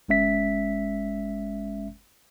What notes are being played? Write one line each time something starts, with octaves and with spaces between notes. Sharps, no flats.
G1 G#3 C#4 E5 B6